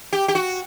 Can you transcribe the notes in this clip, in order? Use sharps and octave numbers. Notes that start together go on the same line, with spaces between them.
G4
G4
F#4